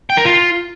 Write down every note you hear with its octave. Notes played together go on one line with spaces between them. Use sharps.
G5
A#4
F4